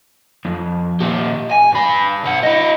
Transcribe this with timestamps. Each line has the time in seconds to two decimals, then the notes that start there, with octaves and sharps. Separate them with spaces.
0.45 F2
1.01 A#2 G4
1.51 G#5
1.72 G2 B5
2.24 B1 F#5
2.43 E4 D#5